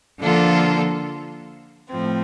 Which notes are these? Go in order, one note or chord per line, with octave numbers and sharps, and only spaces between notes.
D3 F3 A#3 F4 A4
A2 F3 C4